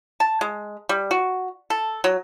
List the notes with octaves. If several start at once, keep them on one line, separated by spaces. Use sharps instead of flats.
A5
G#3
G3
F#4
A4
F#3